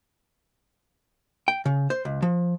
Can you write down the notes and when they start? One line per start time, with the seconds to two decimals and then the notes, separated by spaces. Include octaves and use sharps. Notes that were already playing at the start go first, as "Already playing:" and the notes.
1.48 G5
1.65 C#3
1.90 C5
2.05 C#2
2.22 F3